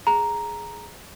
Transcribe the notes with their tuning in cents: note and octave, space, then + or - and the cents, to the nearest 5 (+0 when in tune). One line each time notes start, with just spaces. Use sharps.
G#4 +5 A#5 +0